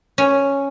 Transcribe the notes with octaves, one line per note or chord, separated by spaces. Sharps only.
C#4